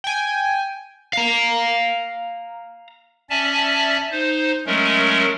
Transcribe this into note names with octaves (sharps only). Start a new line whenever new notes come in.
G5 G#5
F5 A#5
C#4 D5 E5 G#5 A5
D#4 C5
F#3 G#3 A3 C#4 A#4